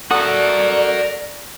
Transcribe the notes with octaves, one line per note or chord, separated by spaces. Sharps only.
F#4 A4 A#4 D5 F#5 D#6